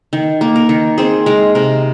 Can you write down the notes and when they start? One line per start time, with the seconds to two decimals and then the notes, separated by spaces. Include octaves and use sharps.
0.13 D#3
0.41 A#3
0.56 A#4
0.69 D#3
0.98 C4 G#4
1.26 G#3 A#4
1.55 C3 A#4